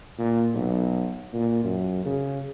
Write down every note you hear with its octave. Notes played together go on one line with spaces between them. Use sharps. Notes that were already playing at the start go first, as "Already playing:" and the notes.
A#2
B1
A#2
F#2
C#3